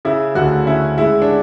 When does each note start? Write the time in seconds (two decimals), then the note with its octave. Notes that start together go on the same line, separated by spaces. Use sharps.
0.05 C#3 E4
0.35 D2 F#4
0.66 C#4 E4
0.97 G#3 E4
1.22 D4